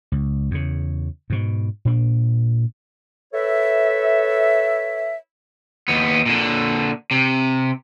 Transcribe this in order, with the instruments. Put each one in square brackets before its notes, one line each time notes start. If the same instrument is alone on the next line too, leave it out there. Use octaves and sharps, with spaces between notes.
[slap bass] C#2
E2 C#3
G#2 B2
A#2 D4
[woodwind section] A4 B4 C#5 E5
[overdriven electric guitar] D#2 B3
A#2 D3
C3